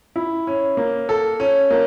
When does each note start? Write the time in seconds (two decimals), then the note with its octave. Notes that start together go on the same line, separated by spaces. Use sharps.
0.16 E4
0.47 C#4
0.77 A#3
1.09 A4
1.40 C#4
1.70 A#3